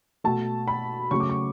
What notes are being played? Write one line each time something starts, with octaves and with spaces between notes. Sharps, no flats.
B2 A3 A5
B5
C#3 F#3 A3 C#6
D6
C#6